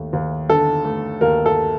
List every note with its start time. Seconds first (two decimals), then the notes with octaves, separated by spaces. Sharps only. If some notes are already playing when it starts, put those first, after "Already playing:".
Already playing: D#2 A3
0.13 D#2
0.50 D3 A4
0.85 A3
1.21 D#2 A#4
1.46 A4